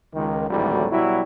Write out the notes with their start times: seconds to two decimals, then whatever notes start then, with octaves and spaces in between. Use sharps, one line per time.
0.14 C#2 D#3
0.50 G#1 D2 A2 E3 F#3 G3
0.91 B2 F#3 G3 E4